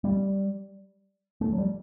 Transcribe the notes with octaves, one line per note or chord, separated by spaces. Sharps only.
G3
A3
F#3
G3